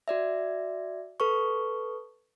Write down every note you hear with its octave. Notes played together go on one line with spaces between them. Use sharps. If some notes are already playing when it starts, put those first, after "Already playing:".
F#4 D5 E5
A4 B4 C#6